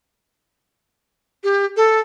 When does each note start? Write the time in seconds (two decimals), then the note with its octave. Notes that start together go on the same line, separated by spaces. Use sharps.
1.44 G4
1.77 A4